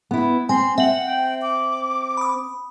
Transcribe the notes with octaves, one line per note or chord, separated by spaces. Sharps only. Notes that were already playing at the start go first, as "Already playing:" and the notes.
B3 E4
C4 G#5 C6
C4 E5 F#5 F#7
G5
D6
B5 D#6